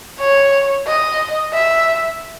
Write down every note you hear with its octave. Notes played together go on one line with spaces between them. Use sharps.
C#5
D#5
E5